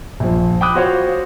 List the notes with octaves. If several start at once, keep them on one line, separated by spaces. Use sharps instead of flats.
A#1 F3
G5 B5 D6 D#6 F#6
F4 F#4 C5 C#5 F5